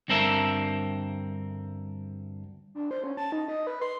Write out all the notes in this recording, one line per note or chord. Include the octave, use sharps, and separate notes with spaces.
D2 G2 C4 A4 A#4 E5
D4
C5
C#4
A5
D#4
D#5
B4
C6